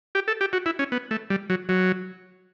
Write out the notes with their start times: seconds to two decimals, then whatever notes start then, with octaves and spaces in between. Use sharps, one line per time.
0.15 G4
0.28 A4
0.41 G4
0.53 F#4
0.66 E4
0.79 C#4
0.92 B3
1.11 A3
1.30 G3
1.50 F#3
1.69 F#3